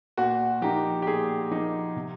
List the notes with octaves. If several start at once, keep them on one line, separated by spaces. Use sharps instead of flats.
A#2 F#4
F3 A#3 D#4 G4
G4
A#2 G#4
F3 A#3 D#4
C3